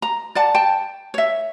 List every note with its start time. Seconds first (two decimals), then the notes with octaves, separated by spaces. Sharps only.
0.02 A#5
0.35 D5 F#5 A5
0.55 G5 A5
1.14 C#5 E5